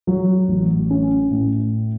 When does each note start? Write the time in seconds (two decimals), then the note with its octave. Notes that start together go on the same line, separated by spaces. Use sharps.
0.07 F#3
0.49 A1
0.90 C#4
1.31 A2